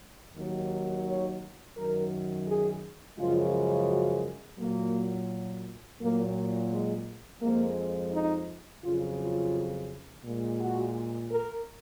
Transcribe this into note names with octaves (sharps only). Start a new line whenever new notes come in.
D#2 D#3 F#3
C#5
F#2 D#3 F#3 A#4
G#4
F#2 C#3 F3 G#3 F4
F#4
A#2 F#3 A#3
A#2 F#3 A#3
G#3
F2 F3 G#3 A#3
D#4
F2 C#3 F#3 F4
F4
A#2 G#3
F#4
A#4